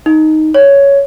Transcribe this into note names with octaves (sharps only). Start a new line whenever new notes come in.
D#4
C#5